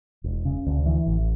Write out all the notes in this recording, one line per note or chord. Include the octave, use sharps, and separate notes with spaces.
E1
C#3
D2
E3
A1